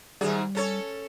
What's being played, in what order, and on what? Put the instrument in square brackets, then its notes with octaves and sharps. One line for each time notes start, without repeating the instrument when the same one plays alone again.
[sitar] G#2 D#3 G#4 [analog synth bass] G3
[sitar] C#4 A4 C#5